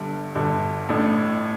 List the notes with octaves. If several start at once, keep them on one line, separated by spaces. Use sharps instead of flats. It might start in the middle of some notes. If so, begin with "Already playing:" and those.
Already playing: G1 G2 D3
G1 G2 D3
A1 A2 A3 D4